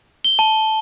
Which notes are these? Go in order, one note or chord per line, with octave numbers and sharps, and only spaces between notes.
G7
A5